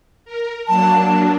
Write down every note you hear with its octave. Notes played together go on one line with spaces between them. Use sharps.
A#4
F#3 A#3 D4 A5